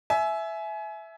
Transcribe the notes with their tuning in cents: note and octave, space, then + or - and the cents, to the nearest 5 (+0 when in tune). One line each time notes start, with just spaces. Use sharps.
E5 +0 G#5 +30